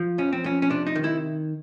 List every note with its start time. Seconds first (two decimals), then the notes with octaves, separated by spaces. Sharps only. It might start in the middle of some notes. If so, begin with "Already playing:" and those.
Already playing: F3
0.18 F2 C#4
0.33 C4
0.44 F2 C#4
0.62 C#4
0.70 C3 D4
0.87 D#4
0.96 D#3
1.04 E4